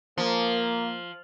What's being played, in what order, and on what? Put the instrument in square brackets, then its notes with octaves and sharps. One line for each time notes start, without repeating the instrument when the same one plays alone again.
[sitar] F3 [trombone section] A#3